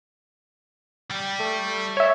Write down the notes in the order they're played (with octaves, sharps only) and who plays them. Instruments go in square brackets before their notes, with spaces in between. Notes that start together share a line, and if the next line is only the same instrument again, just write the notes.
[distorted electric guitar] G3
[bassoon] A3
[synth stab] C#5 E5